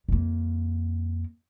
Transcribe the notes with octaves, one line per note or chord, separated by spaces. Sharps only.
F2 A#3